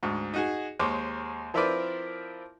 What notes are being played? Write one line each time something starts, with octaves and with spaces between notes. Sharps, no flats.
D2 G#2
D#4 F#4 G#4
D#2 G#3 C5 C#5 D6
F3 C4 E4 A#4 B4 D5